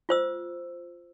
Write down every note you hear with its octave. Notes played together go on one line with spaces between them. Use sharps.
F4 C5 E6